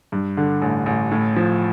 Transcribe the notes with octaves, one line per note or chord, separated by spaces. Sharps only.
G2
D3
A1
A1
A2
F3